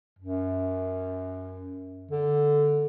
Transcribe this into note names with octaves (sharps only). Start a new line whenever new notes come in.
F#2
D3